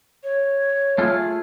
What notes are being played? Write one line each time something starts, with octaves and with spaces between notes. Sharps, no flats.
C#5
A3 F4 G#4